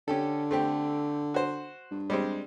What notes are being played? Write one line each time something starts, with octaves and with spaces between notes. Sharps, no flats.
D3 C#4 G4 A4
A3 C4 G4
F#4 C5
G2
G3 G#3 C4